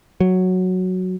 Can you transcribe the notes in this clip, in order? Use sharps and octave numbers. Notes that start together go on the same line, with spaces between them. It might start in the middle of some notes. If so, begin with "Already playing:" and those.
F#3